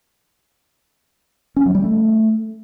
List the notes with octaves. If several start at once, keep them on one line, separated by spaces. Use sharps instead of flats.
C#4
F#3
G3
A3